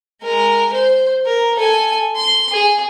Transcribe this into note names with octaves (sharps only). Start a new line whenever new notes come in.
G#3 A#4
C5
A#4
A4 G#5
C6
G#4